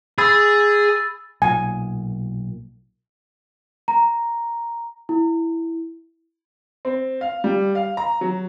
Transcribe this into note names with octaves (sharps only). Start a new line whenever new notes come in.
G#4 B5 E6 A6
B1 A#2 G#5
A#5
E4
C4
F5
G3
F5
A#5
F#3